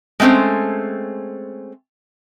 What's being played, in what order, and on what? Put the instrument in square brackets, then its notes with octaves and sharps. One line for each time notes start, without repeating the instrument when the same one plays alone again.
[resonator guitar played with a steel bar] G#3 A3 C4 C#4 C5